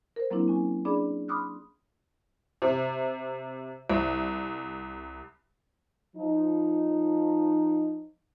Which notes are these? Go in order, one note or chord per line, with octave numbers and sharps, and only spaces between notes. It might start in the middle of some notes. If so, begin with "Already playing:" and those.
A#4 C5
F#3 A#3 C4 D4 E4
C#4 G#5
D4 G#4 D5 B5 D6
B5 C6 D6 D#6 F6 F#6
C3
C2
F3 D#4